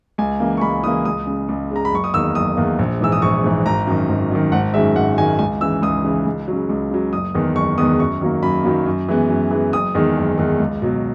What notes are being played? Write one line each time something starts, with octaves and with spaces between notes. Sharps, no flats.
C#2 G#5
C#3 E3 A#3
C#6
C#2 B5
C#3 E3 A#3 D#6
C#2 D#6
C#3 G#3
C#2
C#3 G#3 A#5
B5
F#1 C#6
D#6
E2 D#3 A#3 E6
F#1 D#6
E2 D#3 A#3
A#1
G#2 E3 E6
D#6
A#1 C#6
G#2 E3
G#1 A#5
F#2 D#3
G#1
F#2 D#3
G#1 F#5
F#2 D#3 G#3 E5
G#1 F#5
F#2 D#3 G#3 G#5
C#2 G#5
C#3 E3 E6
C#2 D#6
C#3 E3
C#2
C#3 F#3
C#2
C#3 F#3
F#1 D#6
E2 D#3 G#3 B3
F#1 C#6
E2 D#3 G#3 B3 D#6
F#2 C#6
D#3 F#3 A#3
F#2 B5
D#3 F#3 A#3
F#2
E3 G#3 B3
F#2
E3 G#3 B3
F#1 D#6
E2 D#3 G#3
F#1
E2 D#3 G#3
C#2
B2 F#3